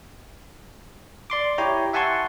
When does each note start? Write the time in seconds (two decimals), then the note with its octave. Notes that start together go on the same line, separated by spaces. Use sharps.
1.30 D5 C6 D6
1.58 E4 G4 C#5 G5 A#5
1.93 E5 F#5 G#5 A5 C6 C#6